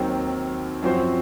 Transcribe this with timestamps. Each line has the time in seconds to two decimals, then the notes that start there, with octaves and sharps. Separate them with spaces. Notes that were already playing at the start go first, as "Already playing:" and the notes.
Already playing: D#2 D#3 F#3 C4
0.82 F#2 F3 C4 F#4 C5